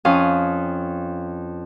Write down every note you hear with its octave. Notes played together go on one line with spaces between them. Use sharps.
F2 C#4 F5 D#6